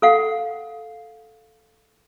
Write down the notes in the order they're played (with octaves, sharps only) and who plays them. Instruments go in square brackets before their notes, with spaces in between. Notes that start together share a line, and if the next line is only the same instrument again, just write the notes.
[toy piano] A4 F5 F#5